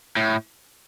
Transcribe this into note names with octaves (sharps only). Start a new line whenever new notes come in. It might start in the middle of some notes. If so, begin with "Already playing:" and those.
A2